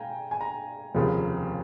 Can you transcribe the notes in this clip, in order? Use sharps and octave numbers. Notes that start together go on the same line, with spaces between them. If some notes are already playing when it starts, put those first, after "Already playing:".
Already playing: F5 G5 G#5 A#5
G#5
A#5
F1 D#2 C#3 F3